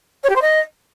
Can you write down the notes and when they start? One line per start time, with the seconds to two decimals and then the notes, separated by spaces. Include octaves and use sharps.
0.23 C#5
0.29 G4
0.35 C5
0.41 D#5